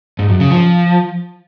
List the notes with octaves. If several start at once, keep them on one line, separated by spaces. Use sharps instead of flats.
G#2
F#2
C#3
F3